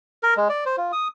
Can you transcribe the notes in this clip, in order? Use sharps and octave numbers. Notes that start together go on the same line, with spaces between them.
A#4
G#3
D5
C5
F4
D#6